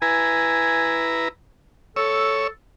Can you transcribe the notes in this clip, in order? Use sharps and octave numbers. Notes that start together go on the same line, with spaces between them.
E4 B4 G#5 A#5
A4 C#5 E6